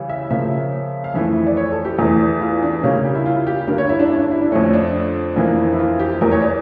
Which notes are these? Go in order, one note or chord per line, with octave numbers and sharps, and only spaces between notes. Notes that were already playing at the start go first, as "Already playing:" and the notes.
Already playing: C#3 E3 G3
E5
C#3 F3 A#3 E5
F5
F2 E3 A3 E5
D5
C#5
A4
G4
E2 E3 A3
F4
D4
C#3 G3 A#3 C#4
G4
E4
F4
G4
G2 D3 G3 A#3 A#4
C#5
E4
D4
C#4
D4
E4
D4
F2 D3 A3 C#4
D4
F2 E3 A#3
E4
F4
G4
E2 E3 G3 A#4
C#5
D5